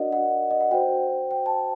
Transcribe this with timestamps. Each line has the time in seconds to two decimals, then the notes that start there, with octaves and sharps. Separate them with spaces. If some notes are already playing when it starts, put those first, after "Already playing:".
Already playing: D4 F#4 A#4 D5 D#5 F#5
0.12 F#5
0.51 D#5
0.61 F#5
0.71 F#4 C5 G5
1.31 G5
1.46 A5